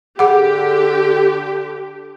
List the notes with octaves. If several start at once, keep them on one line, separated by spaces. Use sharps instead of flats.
D3 G4 G#4 F#5